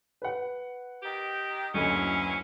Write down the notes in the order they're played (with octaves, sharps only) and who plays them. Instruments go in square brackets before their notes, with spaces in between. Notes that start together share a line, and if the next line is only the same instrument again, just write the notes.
[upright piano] B4 F#5
[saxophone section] D#3 G4
[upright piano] F#1 D2 D#5 [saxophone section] E3 F#3 C#4